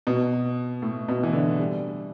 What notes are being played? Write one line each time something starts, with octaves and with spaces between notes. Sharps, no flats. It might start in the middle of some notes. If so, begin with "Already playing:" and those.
B2
A2
B2
E3
D3
G3